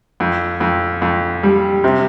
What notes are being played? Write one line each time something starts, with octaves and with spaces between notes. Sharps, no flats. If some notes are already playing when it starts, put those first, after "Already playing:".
F2
F2
F2
G3
C3